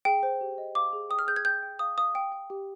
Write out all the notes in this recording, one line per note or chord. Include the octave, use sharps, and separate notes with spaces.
G#4 G5
C5
G4
D#5
F5 D6
G#4
G5 D#6
F6
G#4 G6
G#6
G5 G6
G5
F5 D#6
F5 D#6
G5
G5
G4